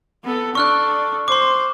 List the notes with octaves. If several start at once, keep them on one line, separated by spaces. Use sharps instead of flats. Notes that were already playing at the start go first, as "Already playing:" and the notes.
B3 A4
D4 A4 C#6 F6 F#6
C5 C6 D6